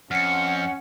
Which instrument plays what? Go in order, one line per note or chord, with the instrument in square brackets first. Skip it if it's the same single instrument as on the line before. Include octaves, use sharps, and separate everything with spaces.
[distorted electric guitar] F2 [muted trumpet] C#4 [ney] F#5 [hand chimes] F6 C#7